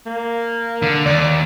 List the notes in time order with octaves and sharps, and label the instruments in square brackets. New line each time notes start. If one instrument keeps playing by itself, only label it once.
[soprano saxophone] A#3
[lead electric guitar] D3
[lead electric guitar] D#2 [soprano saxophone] D5